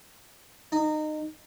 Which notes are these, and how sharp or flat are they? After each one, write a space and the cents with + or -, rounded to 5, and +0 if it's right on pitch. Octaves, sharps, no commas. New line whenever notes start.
D#4 -25